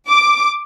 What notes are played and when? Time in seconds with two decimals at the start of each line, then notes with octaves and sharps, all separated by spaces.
0.09 D6